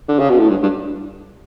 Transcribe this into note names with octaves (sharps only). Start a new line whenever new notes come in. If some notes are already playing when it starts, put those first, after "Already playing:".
D3
C#3
B2
A2
G2
G2